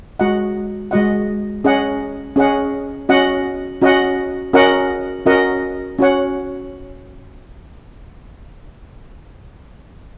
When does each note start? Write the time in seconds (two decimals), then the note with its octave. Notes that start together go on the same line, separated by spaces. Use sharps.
0.19 G#3 F#4 D#5 F#5
0.91 G#3 F#4 D#5 F#5
1.64 C#4 G#4 D#5 F#5
2.36 C#4 G#4 D#5 F#5
3.09 C#4 F#4 D#5 F#5
3.81 C#4 F#4 D#5 F#5
4.53 C#4 F#4 A#4 D#5 F#5
5.26 C#4 F#4 A#4 D#5 F#5
5.98 C#4 F#4 C#5 F#5